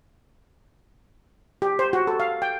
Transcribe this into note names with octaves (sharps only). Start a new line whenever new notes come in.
G4
C5
F#4
A4
F5
G5